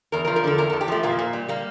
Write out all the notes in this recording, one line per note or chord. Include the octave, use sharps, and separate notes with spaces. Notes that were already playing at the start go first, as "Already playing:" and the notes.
E2 A#4
A#4
F3
A#4
D3 A4
E2 A#4
A4
E2
G4
F3 A3
A#2 A#3
A#2
G3
G3 A#3